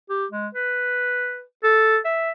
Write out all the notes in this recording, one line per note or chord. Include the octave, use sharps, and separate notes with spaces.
G4
G#3
B4
A4
E5